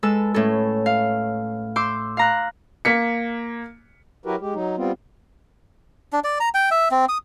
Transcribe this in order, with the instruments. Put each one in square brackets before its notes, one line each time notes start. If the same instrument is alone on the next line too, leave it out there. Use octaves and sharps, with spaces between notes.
[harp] G#3 A4 B4 E6
A2 C#4 A4
F5
C6 D6 E6 G6
F5 A#5 F#6
[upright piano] A#3 B6 C#7
[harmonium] F#3 E4 F#4 G4 A#4 B4
G#3 G4
F#3 D#4
G3 B3 C4 F4
[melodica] D4
D5
A#5
G5
E5
C4
D#6